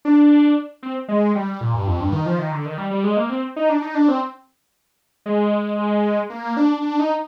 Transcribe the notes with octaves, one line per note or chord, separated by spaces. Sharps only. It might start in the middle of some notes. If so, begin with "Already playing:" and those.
D4
C4
G#3
G3
A#2
G2
F2
G2
D#3
F3
D#3
D3
D#3
G3
G3
G#3
A#3
C4
D#4
D4
D#4
D4
C4
G#3
A#3
D4
D4
D#4